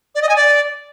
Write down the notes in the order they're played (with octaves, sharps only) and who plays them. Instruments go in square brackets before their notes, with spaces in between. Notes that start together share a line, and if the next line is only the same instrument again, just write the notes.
[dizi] D5
D#5
G#5
D5